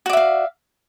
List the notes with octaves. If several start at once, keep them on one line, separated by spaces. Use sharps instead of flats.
F#4 D5 E5 F5